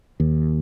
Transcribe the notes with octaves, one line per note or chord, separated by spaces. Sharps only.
D#2